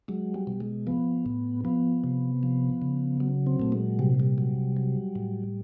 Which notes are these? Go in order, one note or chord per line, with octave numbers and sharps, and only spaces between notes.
F#3 G#3
G3
B2
G#3
F3 B3
A2
F3 B3
C3
F3
C#3
F#3
C4
A#2 A3
G#3
C3 G3
G3
F#3
F#3
A2